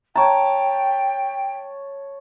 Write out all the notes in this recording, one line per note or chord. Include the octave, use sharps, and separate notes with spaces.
C#5 G5 A5 A#5